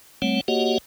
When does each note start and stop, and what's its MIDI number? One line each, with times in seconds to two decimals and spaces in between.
0.22 0.41 55
0.22 0.41 57
0.22 0.41 60
0.22 0.41 73
0.22 0.41 78
0.48 0.78 58
0.48 0.78 66
0.48 0.78 67
0.48 0.78 73
0.48 0.78 75
0.48 0.78 78